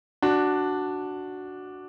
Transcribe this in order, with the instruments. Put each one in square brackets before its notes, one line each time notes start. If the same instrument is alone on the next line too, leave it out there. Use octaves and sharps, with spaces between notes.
[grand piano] D4 F#4